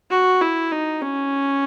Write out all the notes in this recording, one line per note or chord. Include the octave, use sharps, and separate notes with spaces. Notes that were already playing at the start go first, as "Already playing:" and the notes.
F#4
E4
D#4
C#4